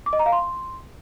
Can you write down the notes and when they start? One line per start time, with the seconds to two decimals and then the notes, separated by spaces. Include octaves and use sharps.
0.06 D6
0.13 D#5
0.19 A#5
0.26 F5
0.32 C6